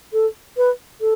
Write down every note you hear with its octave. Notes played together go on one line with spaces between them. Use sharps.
A4
B4
A4